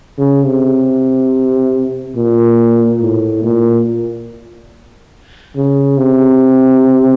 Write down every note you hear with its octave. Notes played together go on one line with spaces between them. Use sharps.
C#3
C3
A#2
A2
A#2
C#3
C3